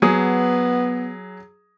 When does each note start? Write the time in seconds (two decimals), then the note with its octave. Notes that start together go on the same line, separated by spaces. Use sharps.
0.02 F#3 B3 G#4 D#6